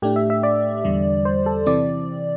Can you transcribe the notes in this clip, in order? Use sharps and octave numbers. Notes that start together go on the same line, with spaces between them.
A2 A3 D4 G4
E5
E5
D5
E2 D3 G3
C5
A4
C3 E3 C4 D5